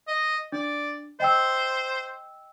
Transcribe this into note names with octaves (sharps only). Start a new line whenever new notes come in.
D#5
D4 D5
C5 D#5 G5 E6